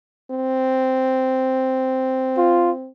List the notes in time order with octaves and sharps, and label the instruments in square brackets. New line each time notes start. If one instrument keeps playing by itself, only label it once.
[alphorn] C4
[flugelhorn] F4